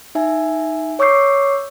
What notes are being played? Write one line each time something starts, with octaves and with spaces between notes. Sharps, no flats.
D#4 E5 G#5
C#5 C#6 D6 E6 G6 C7